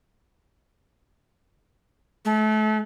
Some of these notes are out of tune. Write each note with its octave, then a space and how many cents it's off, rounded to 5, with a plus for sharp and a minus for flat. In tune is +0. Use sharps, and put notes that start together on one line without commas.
A3 -35